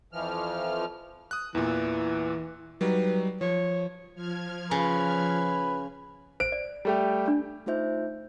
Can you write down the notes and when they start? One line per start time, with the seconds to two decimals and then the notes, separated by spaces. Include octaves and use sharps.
0.13 F2 E3 F3 F6
1.31 D#6 F#6
1.55 E2 A#2 E3
2.81 F#3 G3 D#4 B4
3.41 F3 C#5
4.15 F3 F6 G#6
4.71 C#3 B4
6.40 C5 D7
6.52 D5
6.85 G3 A3 G4
7.28 D4
7.66 A3 D#4 F4 C5 E5 G6